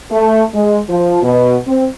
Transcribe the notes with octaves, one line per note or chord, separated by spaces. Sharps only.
A3
G#3
F3
B2
C4